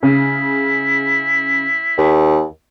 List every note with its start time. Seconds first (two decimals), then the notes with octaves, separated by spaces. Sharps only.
0.03 C#3 E4
1.98 D#2